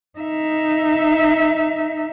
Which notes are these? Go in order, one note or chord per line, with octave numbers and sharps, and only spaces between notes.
D#4 E5